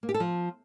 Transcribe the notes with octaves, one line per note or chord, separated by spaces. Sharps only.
A#3
G4
A4
F3